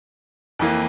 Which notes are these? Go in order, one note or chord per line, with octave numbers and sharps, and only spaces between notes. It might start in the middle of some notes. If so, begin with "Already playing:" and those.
F2 E3 A#3